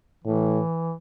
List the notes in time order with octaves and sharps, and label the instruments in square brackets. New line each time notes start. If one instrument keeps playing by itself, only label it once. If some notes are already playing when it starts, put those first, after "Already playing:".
[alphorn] A2 [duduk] E3